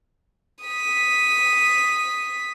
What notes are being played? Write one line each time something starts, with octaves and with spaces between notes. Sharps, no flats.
D#6 B6